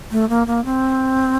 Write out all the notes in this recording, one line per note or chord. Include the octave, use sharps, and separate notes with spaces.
A3
A#3
A#3
C4